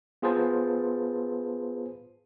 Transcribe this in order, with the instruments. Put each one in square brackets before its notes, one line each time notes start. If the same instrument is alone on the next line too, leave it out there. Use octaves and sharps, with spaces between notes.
[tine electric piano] B3 F4 G#4 B4 C5 A5